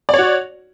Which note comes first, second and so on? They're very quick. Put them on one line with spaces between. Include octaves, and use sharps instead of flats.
D5 C#5 F#4